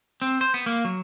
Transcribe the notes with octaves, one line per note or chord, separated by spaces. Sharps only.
C4
C5
B3
A#3
F#3